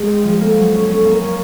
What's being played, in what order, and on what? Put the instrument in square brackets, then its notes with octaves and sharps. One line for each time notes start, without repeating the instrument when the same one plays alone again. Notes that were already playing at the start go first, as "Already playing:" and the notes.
Already playing: [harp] G#3 [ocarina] G#4
[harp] C4
F3
[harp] A#3 [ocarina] A4
[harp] F#3
C#4
[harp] C#4 [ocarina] A4
[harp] A#3
[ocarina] A#4
[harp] C#4